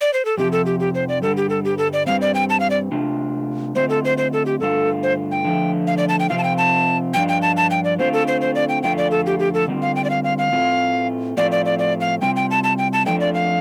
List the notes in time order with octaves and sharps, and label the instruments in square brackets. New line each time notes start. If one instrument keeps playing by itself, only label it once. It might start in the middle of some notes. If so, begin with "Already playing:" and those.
[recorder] D5
C5
A4
[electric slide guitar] F2 C3 F3 [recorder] G4
[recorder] A4
G4
G4
C5
D5
[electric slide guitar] G2 D3 G3 [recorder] A4
[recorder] G4
A4
G4
A4
D5
[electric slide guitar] G2 G3 C4 [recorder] F5
[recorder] D5
G5
A5
F5
D5
[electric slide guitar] C3 A3 D4 F4
[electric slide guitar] D3 A3 C4 F4 [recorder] C5
[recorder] A4
C5
C5
A4
G4
[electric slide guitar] G2 D3 A3 F4 [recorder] A4
[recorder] C5
G5
[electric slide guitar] D3 F3 A3
[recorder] F5
D5
A5
G5
[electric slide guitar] C3 F3 C4 F4 [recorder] F5
[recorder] A5
G5
A5
[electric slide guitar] G2 F3 D4 F4 [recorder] G5
[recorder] G5
A5
A5
G5
D5
[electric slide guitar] D3 A3 C4 F4 [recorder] C5
[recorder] A4
C5
C5
D5
G5
[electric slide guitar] F2 D3 A3 F4 [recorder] G5
[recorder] D5
A4
G4
G4
A4
[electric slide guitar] D3 G3 C4 F4
[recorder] F5
G5
D5
F5
F5
F5
[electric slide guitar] A2 A3 C4 F4
[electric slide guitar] A2 F3 A3 C4 F4 [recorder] D5
[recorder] D5
D5
D5
F5
[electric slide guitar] C3 G3 C4 F4 [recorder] G5
[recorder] G5
A5
A5
G5
A5
[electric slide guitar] F2 F3 A3 D4 [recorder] G5
[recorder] D5
F5